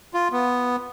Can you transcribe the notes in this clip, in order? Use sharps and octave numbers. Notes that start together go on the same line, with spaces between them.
F4
B3